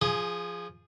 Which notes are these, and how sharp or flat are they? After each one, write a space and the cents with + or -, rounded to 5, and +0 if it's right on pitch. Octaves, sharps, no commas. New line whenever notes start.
F3 +0 G#4 +0 G#5 +25